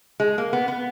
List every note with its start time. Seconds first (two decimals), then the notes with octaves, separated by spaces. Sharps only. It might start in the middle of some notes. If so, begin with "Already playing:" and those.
0.20 G#3
0.38 A#3
0.53 B3
0.68 B3